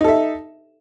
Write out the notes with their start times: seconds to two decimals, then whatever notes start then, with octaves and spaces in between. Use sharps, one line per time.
0.01 D#4
0.04 A4
0.08 E5